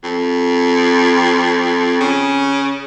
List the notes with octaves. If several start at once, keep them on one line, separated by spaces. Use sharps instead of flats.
F2
C#3